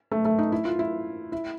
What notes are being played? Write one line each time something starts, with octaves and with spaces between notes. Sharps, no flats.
A3
A3
D#4
E4
F4
E4
E4